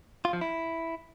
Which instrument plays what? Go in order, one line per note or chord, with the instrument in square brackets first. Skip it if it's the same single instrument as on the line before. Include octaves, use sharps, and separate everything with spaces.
[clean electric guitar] F4
F3
E4